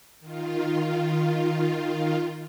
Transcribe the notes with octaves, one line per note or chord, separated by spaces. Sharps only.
D#3 F4